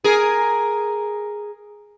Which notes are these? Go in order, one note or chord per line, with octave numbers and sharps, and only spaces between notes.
G#4 A#4